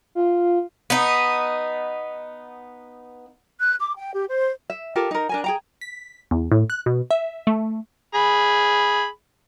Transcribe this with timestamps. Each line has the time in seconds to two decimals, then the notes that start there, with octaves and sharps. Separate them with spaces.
0.15 F4
0.90 B3 D#4
3.59 F#6
3.79 D6
3.96 G5
4.12 G4
4.28 C5
4.70 E5
4.96 F4 G4 A4 A#4
5.11 D#4 A#4
5.29 D4 A#4 G#5
5.44 G#4 G5 A#5
5.81 B6
6.31 E2
6.52 A2
6.70 F#6
6.86 B2
7.11 E5
7.47 A3
8.14 G#4 B5